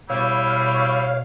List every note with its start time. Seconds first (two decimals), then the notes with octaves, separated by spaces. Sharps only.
0.10 B2 G3 E4 C#5 F5